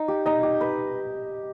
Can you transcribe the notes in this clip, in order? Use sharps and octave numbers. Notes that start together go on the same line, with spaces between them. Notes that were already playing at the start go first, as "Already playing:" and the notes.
Already playing: D#4
G4
D#4 D#5
G4
B4